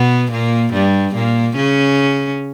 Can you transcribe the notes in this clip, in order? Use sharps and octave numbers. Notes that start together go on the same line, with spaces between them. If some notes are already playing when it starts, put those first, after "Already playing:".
Already playing: B2 B3
A#2 A#3
G2 G3
A#2 A#3
C#3 C#4